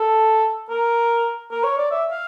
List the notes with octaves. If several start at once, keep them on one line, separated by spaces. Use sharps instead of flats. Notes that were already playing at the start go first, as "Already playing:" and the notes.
Already playing: A4
A#4
A#4
C#5
D5
E5
F5